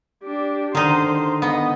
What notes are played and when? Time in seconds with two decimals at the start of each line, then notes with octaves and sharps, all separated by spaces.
0.23 D4 G4
0.75 D3 D#3 D#4 C5 C6
1.42 B3 D#5